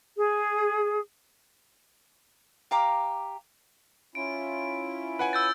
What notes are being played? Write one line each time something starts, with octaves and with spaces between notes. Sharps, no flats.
G#4
G4 F5 A#5 D6
C#4 E4 F4 D7
B4 F#5 G#5
E6 G6 A6